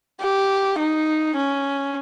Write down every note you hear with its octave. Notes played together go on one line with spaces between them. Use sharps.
G4
D#4
C#4